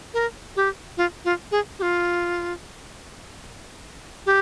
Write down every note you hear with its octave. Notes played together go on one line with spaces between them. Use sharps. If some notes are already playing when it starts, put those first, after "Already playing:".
A#4
G4
F4
F4
G#4
G4
F4
G4